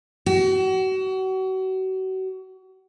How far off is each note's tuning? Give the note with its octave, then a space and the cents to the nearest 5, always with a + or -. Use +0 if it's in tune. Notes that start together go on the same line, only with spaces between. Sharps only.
F#4 +35